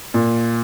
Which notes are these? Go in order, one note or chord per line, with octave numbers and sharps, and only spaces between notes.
A#2